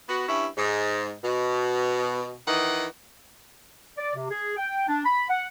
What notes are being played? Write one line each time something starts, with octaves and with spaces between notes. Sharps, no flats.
B3 F#4
G2 C#4 E4 E5
G#2
B2
D#3 E3 D#5 F#5
D5
C3
G#4
G5
D4
B5
F#5